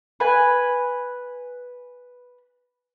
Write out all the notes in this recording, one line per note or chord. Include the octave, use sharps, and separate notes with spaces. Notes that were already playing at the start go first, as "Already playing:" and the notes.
B4 G#5